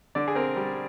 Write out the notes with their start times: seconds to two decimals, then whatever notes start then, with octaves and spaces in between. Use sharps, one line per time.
0.15 D3 D5
0.28 G#4
0.35 C4 A#4
0.56 G3